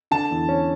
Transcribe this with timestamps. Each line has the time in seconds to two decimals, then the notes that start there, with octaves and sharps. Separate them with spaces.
0.11 D3 A5
0.31 E2
0.49 C#4